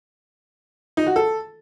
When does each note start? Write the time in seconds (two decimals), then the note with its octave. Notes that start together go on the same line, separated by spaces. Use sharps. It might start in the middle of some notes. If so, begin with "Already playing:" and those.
0.97 D#4
1.07 F#4
1.16 A4